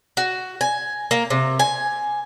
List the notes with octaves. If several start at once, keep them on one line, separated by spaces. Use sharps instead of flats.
F#4
G#5
A#3
C3
G#5